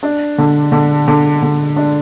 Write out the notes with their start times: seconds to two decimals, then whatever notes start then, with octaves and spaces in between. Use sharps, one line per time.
0.03 D4
0.38 D3
0.72 D3
1.08 D3
1.42 D3
1.76 D4